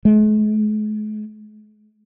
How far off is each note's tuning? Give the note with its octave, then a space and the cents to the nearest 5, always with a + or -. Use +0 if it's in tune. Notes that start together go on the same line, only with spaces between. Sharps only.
G#3 +45